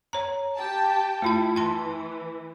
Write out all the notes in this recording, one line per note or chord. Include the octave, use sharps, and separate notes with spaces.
C#5 A#5
G4 G5 A5
A3 E4 F4 A5
E3 A5 C6